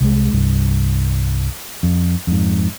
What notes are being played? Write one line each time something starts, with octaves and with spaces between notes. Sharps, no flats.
C2 G#3
C2 G2
F2
F2 G#2